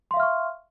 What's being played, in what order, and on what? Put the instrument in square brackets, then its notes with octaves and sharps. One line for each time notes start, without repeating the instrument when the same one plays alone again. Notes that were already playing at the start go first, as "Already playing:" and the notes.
[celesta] C6
F5
E5
F6
C#6